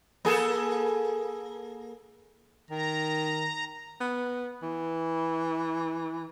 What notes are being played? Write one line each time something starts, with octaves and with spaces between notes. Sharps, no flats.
A#3 G#4 A4
D#3 A#5
B3
E3